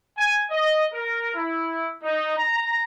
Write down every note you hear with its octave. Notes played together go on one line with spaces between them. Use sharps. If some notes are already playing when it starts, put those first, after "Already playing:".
G#5
D#5
A#4
E4
D#4
A#5